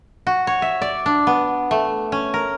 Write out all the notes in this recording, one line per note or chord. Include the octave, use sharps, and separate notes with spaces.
F#4
C#5
E5
D5
D4
B3
A3
C#4
A#4